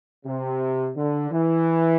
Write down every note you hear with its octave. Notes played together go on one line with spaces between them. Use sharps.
C3
D3
E3